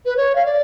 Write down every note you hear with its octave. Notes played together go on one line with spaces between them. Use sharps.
B4
C#5
F5
D5